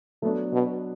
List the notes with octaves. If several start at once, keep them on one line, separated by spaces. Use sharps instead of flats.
F#3 A3 B3 D4
B2